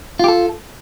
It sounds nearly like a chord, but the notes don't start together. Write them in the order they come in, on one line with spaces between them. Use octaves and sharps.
F4 G4 A4